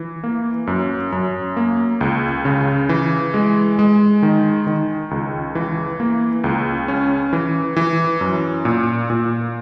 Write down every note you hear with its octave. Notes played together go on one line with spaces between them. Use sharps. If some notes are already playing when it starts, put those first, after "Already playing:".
Already playing: E3
A#3
F#2
F#2
A#3
C#2
C#3
E3
G#3
G#3
D#3
D#3
C#2
E3
A#3
C#2
C#4
E3
E3
F#2
A#2
A#2